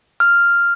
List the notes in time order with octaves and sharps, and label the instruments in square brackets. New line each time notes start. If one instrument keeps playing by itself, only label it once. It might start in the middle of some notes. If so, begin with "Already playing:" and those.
[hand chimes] F6